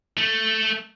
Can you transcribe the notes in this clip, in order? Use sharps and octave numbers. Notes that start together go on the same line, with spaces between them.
A3